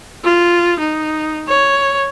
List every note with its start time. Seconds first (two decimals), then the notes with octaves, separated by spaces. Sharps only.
0.24 F4
0.80 D#4
1.48 C#5